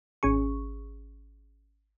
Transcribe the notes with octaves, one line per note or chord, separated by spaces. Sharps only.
G#1 C#4 G#4 C#6